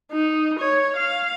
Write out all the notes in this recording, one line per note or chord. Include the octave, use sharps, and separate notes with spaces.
D#4
C#5
F5